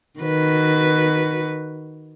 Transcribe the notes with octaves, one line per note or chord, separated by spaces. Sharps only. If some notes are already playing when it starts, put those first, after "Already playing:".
D#3 F#4 B4